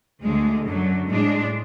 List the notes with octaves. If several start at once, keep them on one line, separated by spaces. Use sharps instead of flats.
D2 D3 G#3
F#2 D3 F#3
A2 G#3 D4